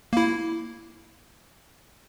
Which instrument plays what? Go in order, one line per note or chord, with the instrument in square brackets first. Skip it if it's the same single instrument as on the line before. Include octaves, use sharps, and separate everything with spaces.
[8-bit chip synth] A#3 E4